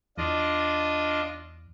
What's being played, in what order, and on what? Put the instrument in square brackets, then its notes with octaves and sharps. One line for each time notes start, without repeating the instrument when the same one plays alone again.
[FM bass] E2 [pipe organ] D4 F4 D#5